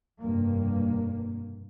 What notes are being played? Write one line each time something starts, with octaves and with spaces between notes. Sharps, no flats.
F1 G2 B2 A#3